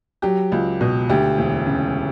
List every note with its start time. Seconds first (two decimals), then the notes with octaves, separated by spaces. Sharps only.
0.22 F#3 G4
0.52 C#2
0.81 B2
1.09 D2 G4
1.38 E1
1.66 C#3